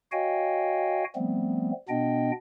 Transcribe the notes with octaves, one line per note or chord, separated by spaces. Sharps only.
F#4 C#5 D#5 F5 G5 G#5
F3 G3 A3 B3 C4
B2 B3 D4 D#5 G5